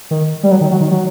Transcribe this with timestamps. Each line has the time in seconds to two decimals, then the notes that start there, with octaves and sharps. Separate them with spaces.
0.11 D#3
0.43 G3
0.51 F#3
0.61 D#3
0.71 F#3
0.80 D#3
0.91 F#3